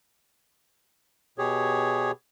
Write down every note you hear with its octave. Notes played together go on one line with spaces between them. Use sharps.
B2 G4 G#4 C#5